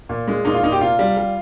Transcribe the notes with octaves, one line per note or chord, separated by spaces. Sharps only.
A#2
G#3
A#2 D#4
F4
A#2 D#4
G4
C3 F4
G3
G3